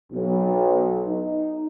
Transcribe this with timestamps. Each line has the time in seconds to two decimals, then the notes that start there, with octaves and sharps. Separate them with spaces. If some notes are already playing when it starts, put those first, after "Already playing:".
0.12 B1
1.07 D#4